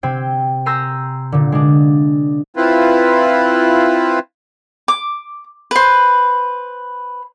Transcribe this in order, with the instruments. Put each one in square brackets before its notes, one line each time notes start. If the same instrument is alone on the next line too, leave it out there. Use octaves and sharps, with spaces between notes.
[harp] C3 C4 G5 G#6
G#5 A#5 C6 E6 G6 A#6
A#2 D3
G#3 D4
[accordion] C4 E4 F4 B4
[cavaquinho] D6
B4 C5